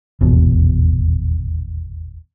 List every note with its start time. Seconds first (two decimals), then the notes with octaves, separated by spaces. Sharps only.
0.21 D#1 G#1 E2 B2